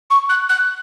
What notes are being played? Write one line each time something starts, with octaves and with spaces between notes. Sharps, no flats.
C#6
F#6
F#6